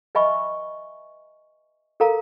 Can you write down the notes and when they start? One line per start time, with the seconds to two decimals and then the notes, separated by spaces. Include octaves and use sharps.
0.15 B4 D#5 E5 G#5 B5 C#6
2.00 A4 A#4 F5 A#5